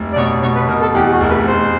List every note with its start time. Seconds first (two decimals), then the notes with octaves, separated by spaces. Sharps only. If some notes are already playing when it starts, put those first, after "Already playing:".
Already playing: F1
0.12 D5
0.16 B2 C#5
0.42 B2 C#5
0.55 B4
0.68 B2 A#4
0.82 A4
0.95 E2 G4
1.12 F#4
1.20 F1 A#4
1.29 B4
1.47 F1 C5